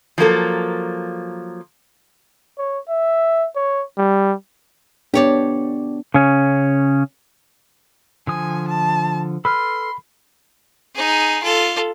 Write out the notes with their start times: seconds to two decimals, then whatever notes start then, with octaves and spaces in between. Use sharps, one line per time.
0.18 F3 F#3 A#3 A4
2.58 C#5
2.89 E5
3.56 C#5
3.98 G3
5.14 B3 D4 G4 C#5 D5
6.14 C#3 C#4
8.27 D3 F3 G#5 D#6
8.68 A5
9.45 A4 B4 B5 C6 F6
10.95 D#4 G#4
11.43 F4 A4